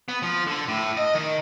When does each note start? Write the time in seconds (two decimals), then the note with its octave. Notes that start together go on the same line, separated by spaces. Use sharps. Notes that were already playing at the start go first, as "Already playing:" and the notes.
0.08 B3
0.22 F3
0.47 D3
0.68 A2
0.97 D#5
1.15 D#3